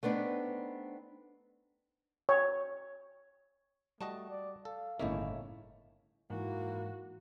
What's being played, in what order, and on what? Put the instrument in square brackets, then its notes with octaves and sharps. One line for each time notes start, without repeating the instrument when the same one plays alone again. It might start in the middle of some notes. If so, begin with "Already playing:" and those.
[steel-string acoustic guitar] A3 B3 C4 D4 D#4
[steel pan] C#5
[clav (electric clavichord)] G3 F#4 D#5 [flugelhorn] A3 [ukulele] A5
[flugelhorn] D5
[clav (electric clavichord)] A4 [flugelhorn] F5
[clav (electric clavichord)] G1 A#3 [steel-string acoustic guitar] A2 C#3 E5 [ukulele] C#4 D#4 E4
[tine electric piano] G#2 [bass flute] E3 [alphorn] A#3 [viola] F#4